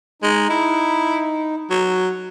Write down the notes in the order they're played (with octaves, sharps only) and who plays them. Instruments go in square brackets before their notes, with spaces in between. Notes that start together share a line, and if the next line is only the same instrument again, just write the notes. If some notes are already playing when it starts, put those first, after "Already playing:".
[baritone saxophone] G#3 [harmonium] D#4
[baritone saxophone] E4
F#3